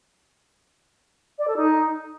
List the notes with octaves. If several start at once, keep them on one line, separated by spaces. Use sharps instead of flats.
D5
A4
D#4